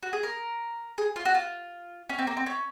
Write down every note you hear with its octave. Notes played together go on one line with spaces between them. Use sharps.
F#4
G#4
A#4
G#4
F4
F#4
F4
C#4
C4
A#3
C4
C#4